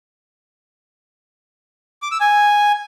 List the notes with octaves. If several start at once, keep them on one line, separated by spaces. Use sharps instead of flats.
D6
E6
G#5